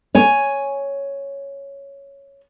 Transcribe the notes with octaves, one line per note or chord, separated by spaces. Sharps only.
C#5 G#5